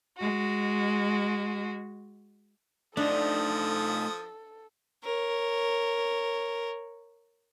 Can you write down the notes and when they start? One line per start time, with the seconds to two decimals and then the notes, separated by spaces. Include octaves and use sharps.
0.18 G#3 F#4
2.97 F3 A3 D4 D#4 A4 D#6
5.04 A#4 C#5